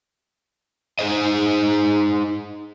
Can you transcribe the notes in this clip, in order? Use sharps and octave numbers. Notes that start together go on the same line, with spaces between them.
D#4 G#4 B4 C5 D#5